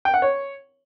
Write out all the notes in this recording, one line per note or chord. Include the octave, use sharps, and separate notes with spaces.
G5
F#5
C#5